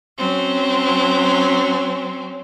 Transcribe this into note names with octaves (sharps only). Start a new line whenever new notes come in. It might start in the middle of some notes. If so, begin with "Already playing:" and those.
F#3 C4 C#4